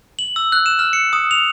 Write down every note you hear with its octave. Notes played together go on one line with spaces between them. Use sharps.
F#7
E6
F#6
E7
F6
C#7
D#6
F7